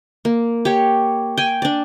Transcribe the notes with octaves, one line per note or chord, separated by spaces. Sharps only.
A#3
G4 C#5
G5 G#5
D4 D5